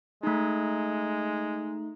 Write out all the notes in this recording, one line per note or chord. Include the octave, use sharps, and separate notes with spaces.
G#3 A3 D#4